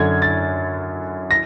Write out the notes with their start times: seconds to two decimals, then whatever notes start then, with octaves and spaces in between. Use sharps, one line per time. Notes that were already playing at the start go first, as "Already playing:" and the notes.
Already playing: F#2 D3 G#6
0.22 A6
1.31 A#6